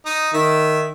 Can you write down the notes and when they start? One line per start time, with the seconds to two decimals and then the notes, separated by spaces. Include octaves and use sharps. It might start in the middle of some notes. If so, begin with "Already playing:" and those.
0.06 D#4 D#6
0.34 D#3 E5